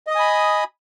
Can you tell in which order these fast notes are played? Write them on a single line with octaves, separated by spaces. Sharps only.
D#5 D#6 G#5 B5